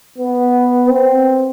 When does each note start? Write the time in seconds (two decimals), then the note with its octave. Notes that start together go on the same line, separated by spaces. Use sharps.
0.18 B3
0.89 C4